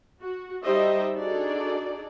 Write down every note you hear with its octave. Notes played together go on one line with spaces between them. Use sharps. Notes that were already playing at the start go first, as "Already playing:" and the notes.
F#4
G3 D#4 G4 C5 D#5 E5
D4 D#4 F#4 G#4 A4 D5